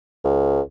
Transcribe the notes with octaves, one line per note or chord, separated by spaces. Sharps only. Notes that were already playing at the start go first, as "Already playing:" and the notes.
C#2